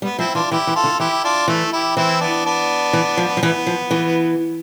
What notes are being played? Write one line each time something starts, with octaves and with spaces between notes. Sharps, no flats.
G3 B3
F3 C4 E4
E3 D4 F4
E3 E4 G4
E3
F4 A4
D3
E3 E4 G4
D4 F4
E3 A3
E4 G4
E3 C4 E4
B3 D4
B3 D4
E3
F3
F3
E3 B3
F3
E3